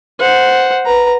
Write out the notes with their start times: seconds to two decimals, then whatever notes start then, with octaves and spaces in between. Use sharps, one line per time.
0.20 C5 F#5
0.85 B4 A#5